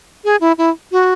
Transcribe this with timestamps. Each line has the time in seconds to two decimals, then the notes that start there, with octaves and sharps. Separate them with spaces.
0.25 G#4
0.41 E4
0.58 E4
0.92 F#4